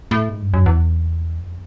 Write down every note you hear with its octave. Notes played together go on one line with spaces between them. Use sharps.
A2
G#2
G2
F#2
E2
F2